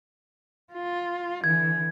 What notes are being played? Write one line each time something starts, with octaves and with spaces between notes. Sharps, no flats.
F4
D3 E3 G#6